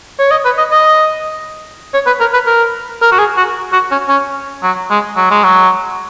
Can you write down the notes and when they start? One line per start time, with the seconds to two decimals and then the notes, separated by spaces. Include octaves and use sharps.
0.19 C#5
0.31 D#5
0.45 B4
0.58 D#5
0.71 D#5
1.94 C#5
2.06 B4
2.20 A#4
2.33 B4
2.47 A#4
3.02 A#4
3.12 F#4
3.19 G#4
3.37 F#4
3.73 F#4
3.91 C#4
4.08 C#4
4.63 F#3
4.90 G#3
5.16 F#3
5.31 G#3
5.43 F#3